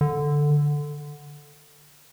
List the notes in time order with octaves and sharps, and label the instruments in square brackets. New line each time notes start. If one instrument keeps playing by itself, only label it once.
[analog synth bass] D3